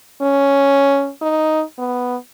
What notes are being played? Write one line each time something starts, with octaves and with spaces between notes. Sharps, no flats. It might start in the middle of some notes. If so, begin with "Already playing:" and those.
C#4
D#4
B3